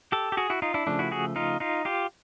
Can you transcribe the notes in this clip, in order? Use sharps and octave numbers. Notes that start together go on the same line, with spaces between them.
G4 A4
G4
F#4 G#4
E4 F#4
D#4 F4
D4 E4
C#3 F3 A3 D4
E4 F#4
F#4 G#4
D#4 F4
D#4 F4
F4 G4